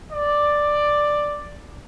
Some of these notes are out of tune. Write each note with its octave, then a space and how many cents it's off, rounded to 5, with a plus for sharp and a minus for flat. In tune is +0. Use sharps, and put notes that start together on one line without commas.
D5 +5